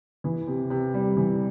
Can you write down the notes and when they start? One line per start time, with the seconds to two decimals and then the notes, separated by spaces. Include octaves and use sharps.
0.24 E3
0.47 C3
0.70 C3
0.94 G3
1.17 E3